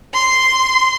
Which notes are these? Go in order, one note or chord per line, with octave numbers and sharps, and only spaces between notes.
C6